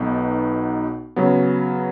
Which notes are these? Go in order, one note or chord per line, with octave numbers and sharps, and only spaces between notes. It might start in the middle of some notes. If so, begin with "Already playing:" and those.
Already playing: B1 B2 B3 D#4 F#4
C#3 F#3 B3